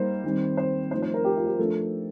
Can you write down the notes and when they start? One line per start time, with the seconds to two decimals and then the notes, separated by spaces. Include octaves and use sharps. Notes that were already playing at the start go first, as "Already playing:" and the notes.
Already playing: G3 A#3 D#4 C5
0.24 D#3 G3 C4
0.57 C5
0.91 D#4 C5
0.94 F3 A3
1.02 C5
1.14 A#4
1.25 G4
1.37 F4
1.47 G4
1.58 F3 A3 D4 A4